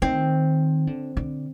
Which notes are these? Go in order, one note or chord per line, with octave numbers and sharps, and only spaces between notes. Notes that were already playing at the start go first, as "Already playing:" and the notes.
D#3 C4
D3
D3